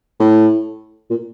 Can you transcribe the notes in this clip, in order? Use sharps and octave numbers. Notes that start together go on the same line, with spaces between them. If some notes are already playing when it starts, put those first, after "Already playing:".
A2
A#2